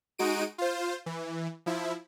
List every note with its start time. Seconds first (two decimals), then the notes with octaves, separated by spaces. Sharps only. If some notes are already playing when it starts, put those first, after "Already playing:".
0.19 G#3 D#4 F#4 D7 D#7
0.58 F4 C5
1.06 E3
1.66 F3 E4